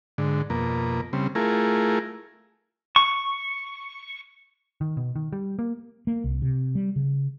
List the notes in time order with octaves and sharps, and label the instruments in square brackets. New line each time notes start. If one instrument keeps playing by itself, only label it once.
[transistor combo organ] G#2 D3
F2 B2 A#3
C#3 G3 C4
A3 E4 F4 G#4 A#4
[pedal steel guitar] C#6
[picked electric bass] D#3
B2
D#3
G3
A#3
[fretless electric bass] A#3
C2
C3
G3
C#3